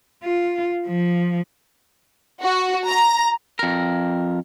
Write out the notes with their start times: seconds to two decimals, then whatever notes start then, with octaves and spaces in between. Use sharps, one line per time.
0.24 F4
0.86 F3
2.43 F#4
2.86 A#5
3.59 F2 A#4